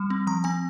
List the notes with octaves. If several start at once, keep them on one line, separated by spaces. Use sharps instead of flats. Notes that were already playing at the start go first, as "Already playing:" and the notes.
Already playing: G3
C4
F3 A#5
C4 G#5